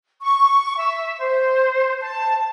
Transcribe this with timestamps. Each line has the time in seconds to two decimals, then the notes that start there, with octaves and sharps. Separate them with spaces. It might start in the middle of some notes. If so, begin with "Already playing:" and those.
0.21 C#6
0.79 E5
1.19 C5
2.01 A5